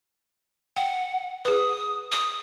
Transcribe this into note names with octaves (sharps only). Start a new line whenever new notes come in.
F#5 G5
G#4 B4 D#6
D#6